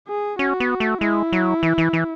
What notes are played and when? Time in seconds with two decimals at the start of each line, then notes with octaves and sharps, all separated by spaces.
0.08 G#4
0.39 C#4 F#4
0.60 B3
0.80 A3
1.01 G#3 E4
1.33 F#3
1.63 E3
1.78 E3
1.93 E3